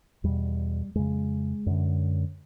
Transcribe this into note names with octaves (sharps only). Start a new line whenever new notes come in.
E2 B2 G3
F2 C#3 G#3
F#2 D3